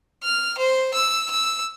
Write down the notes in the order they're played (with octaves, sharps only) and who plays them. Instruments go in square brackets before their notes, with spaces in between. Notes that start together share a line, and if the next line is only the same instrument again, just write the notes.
[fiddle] F6
C5
E6
E6